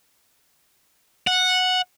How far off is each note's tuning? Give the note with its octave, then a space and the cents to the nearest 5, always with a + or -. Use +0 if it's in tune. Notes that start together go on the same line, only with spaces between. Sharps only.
F#5 -10